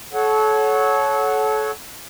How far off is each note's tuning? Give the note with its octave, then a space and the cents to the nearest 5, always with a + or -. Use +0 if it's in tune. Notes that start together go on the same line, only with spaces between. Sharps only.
A4 -30 C#5 +0 F#5 +0